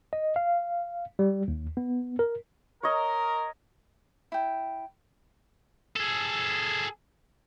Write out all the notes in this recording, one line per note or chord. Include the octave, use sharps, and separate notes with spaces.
D#5
F5
G3
D#2
B3
A#4
A#4 C#5 D#5
E4 G5
G#4 A4